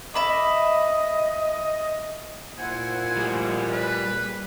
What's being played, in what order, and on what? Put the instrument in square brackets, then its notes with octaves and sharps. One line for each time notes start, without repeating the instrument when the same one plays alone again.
[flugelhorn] D#5 [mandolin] E5 B5 D6
[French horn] A#2 [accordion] E4 C5 F#5 [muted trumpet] G#5
[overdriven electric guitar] G3 G#4
[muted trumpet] B4